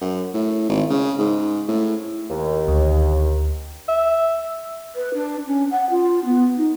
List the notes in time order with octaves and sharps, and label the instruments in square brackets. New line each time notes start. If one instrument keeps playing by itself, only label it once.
[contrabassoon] F#2
A2
G#1
C#3
G#2
A2
[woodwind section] D#2
[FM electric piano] D2
[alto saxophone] E5
[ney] B4
D4
C#4
F#5
F4
B3
D#4